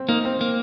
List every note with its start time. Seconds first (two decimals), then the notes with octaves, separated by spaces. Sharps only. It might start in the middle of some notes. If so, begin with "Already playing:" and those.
Already playing: C4
0.09 A#3 D#4
0.25 C4
0.41 A#3